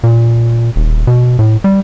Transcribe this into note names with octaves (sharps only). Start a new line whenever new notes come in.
A#2
D#1
B2
A2
G3